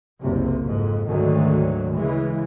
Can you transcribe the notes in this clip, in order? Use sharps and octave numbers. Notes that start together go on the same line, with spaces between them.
F#1 C2 C3
F2 G#2
D2 G#2 D#3 F#3
C#3 E3 G#3